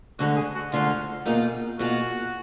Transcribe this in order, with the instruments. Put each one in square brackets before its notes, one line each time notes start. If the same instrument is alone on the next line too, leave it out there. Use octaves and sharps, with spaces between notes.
[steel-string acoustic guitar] D2 D3 G#3 [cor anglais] F#4
[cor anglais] G#4
F#4
[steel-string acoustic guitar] D2 D3 G#3 [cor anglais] F4
[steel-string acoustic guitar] B2 A#3 F4 G#4 [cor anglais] D#4
[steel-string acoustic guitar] B2 A#3 F4 G#4 [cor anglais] F#4